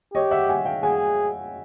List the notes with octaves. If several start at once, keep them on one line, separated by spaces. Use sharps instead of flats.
G4 C#5 D#5
E5 F#5
F#5 G#5
F5 G5
G#4 F#5 G#5